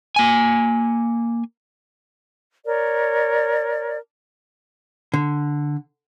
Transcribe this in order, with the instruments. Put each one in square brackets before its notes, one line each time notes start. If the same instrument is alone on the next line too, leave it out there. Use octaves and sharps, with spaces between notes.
[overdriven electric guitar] A#3 G#5
[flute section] A#4 C#5 D5
[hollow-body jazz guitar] D3